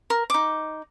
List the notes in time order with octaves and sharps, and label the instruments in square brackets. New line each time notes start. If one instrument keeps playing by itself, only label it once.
[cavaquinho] A#4
D#4 D6